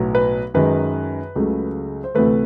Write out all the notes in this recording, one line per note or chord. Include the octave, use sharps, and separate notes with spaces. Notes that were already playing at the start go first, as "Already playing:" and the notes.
Already playing: B1 A2 F#3 B3
B4
F#2 D#3 G#3 B4
C#2 C#3 F#3 A3
C5
D2 C3 E3 A3 B4